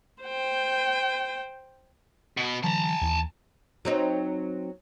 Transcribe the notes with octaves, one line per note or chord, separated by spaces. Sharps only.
C5 G5
B2 B3
D3 E3 F#3 A5 A#5
D#2 E3
F#3 C4 D#4